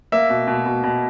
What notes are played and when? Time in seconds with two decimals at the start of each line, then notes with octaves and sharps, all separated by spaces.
0.12 A#3 E5
0.30 B2
0.47 B2
0.66 B2
0.84 B2